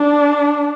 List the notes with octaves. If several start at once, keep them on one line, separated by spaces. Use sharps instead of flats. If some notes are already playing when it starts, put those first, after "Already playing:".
Already playing: D4